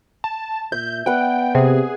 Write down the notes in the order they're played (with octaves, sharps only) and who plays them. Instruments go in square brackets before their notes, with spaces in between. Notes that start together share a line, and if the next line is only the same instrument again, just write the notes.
[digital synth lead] A5
[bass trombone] A#2 [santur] E5 [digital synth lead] G6
[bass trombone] B3 [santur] B4 D5 F#5 [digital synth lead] G5
[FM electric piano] C3 [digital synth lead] G#4